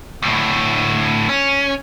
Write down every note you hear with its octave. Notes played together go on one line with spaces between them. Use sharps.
D2 A2
C#4